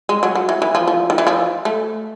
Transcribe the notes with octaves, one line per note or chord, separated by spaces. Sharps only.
G#3
F#3
F#3
E3
E3
F3
F3
D#3
E3
F3
A3